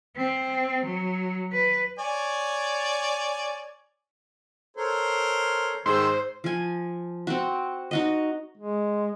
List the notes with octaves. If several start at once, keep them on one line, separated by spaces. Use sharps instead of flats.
C4
F#3
B4
C#5 D5 G#5
A4 A#4 C5 C#5
G#2 D#3 G#4 C5 E6
F3 G#5
C4 F#4
D#4 F#4 D#5
G#3